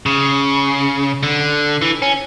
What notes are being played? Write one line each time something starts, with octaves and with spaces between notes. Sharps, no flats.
C#3
D3
E3
C#4